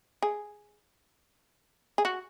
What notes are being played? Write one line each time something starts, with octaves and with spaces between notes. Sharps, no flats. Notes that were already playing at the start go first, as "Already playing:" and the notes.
G#4
G#4
F#4